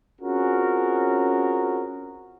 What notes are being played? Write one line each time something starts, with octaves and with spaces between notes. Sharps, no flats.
C4 C#4 F4 F#4 G#4 A#4